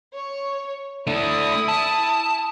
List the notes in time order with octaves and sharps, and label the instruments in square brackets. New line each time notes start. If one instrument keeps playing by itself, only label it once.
[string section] C#5
[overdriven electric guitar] A3 D4 [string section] E4 D#6
[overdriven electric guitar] A5